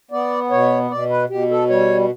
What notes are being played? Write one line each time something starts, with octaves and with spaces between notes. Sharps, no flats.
B3 D5
B2 C#5
B2 D5
B4
B2 G4
A4
G3 C#5